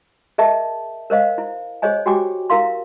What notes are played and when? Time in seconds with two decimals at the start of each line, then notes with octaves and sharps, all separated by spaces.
0.38 G#4 A#4 D#5 E5 A5
1.10 A#4 C5 D#5 F5
1.38 E4
1.82 G#4 C5 C#5 D#5 G#5
2.06 F#4 G4 G5 G#5 D6
2.50 E4 A#4 F5 C6